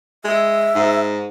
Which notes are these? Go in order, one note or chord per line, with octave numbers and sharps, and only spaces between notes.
G#3 E5
G#2